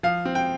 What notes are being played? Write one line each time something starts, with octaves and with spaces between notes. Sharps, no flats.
F3 F5
C4
G5